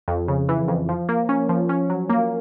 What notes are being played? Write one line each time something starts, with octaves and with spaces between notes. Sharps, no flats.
F2
C#3
E3
F2
F3
A#3
C#4
F3
C#4
F#3
A#3